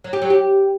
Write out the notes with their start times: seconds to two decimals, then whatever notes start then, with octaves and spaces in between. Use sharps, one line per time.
0.04 F#3
0.13 G4
0.22 F#3
0.30 G4